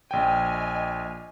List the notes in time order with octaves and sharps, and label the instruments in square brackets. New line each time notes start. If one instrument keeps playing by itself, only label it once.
[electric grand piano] A#1 G5 [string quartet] D#5 G#5 F6